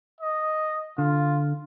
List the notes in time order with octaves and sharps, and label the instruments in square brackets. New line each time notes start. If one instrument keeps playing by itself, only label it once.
[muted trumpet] D#5
[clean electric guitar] D3 [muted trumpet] F4